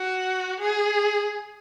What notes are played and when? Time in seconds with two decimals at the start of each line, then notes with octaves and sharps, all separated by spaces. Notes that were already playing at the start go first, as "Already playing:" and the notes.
Already playing: F#4
0.60 G#4